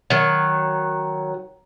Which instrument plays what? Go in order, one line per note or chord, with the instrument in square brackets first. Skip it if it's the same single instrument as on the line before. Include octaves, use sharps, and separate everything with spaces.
[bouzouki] D#3 F#3